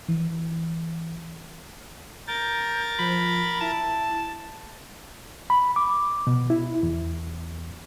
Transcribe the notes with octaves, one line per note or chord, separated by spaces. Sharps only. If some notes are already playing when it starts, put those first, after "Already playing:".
E3
A#4 G6 A6
F3 B5
E4 A5
B5
D6
B2
E4
E2